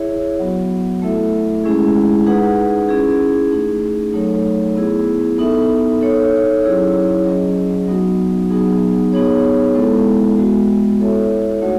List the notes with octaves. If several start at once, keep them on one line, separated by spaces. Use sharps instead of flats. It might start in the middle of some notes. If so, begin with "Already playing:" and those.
Already playing: E4 G#4 C#5 E5
F#3 B3 F#4
A3 E4 A4 E5
G#3 C#4 E4 G#4
D#4 G#4 B4 F#5
C#4 E4 G#4
A3 D#4 G#4
F#3 A3 D#4 A4 C#5
B3 E4 G#4
B3 D#4 A4 E5
D#4 A4 C#5
F#3 C#4 E4 G#4 C#5
F#3 C#4 G#4 D#5
F#3 B3 D#4 F#4
F#3 B3 D#4 G#4
B3 D#4 G#4 C#5
G#3 B3 E4 A4
G#3 B3 F#4
E4 A4 C#5 E5
A3 D#4 F#4 C#5 F#5